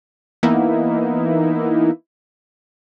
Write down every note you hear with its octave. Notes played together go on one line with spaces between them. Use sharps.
E3 A#3 B3 D#4 E4